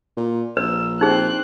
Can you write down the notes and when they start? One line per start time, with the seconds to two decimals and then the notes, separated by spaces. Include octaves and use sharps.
0.17 A#2
0.57 A#1 B4 E6
1.01 C4 D#4 G#4 F#6